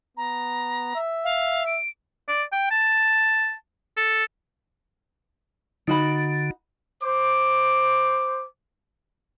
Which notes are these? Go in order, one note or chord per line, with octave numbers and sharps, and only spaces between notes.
B3 A#5
E5
F5
D7
D5
G5
A5
A4
D3 D#4 F#4 B5
C5 D6